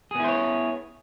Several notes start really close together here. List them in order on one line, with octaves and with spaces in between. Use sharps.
G#4 B3 E4 C5 C#5